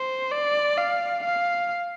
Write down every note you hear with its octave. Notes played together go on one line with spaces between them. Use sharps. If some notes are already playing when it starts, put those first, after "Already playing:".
Already playing: C5
D5
F5
F5